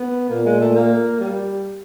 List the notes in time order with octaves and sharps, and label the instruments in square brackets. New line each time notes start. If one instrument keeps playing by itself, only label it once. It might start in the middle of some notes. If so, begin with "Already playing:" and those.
Already playing: [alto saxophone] B3
[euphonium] A#2 [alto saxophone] A#3
[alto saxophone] G#3
A3
A#3
G3